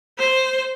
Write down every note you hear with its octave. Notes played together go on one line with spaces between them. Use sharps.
C5